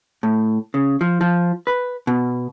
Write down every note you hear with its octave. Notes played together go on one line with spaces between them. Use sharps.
A2
C#3
F3
F3
B4
B2